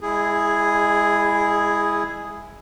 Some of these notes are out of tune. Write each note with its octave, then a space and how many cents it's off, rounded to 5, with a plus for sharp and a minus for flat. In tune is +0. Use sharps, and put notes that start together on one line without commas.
G#3 -30 E4 +0 G#4 +0